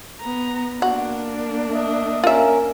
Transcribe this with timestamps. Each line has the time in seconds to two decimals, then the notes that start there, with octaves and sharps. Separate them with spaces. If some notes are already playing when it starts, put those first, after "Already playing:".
0.21 B3 A#5
0.82 A#3 D4 F#4
1.72 D#5 E5
2.24 C#4 F4 A#4 E5